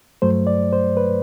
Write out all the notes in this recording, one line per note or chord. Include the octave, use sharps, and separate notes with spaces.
G2 F#3 A3 C5
D5
C5
B4